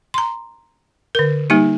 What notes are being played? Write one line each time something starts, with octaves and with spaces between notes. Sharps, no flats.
A#5 C6
D3 A#4
G3 A#3 D#4 G4